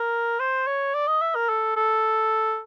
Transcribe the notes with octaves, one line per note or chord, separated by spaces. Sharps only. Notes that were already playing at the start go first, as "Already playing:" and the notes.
Already playing: A#4
C5
C#5
D5
D#5
E5
A#4
A4
A4